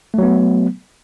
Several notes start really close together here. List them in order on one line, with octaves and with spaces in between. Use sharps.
A3 F#3 B3